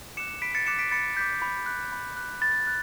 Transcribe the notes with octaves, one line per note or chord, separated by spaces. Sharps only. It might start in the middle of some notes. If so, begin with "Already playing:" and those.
D6 F#6 C#7 E7
B5 B6 D7
A6 C#7
D6 F#6 C#7 E7
B6 D7
B5 A6 C#7
D6 F#6 G6 B6
B5
F#6
B5
F#6
B5 A6
F#6